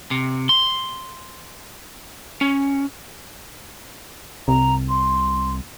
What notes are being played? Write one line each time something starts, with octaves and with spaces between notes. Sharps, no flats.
C3
C6
C#4
C2 A#5
C6